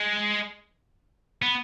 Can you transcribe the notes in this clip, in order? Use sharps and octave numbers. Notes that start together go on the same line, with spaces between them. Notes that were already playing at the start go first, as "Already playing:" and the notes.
Already playing: G#3
B3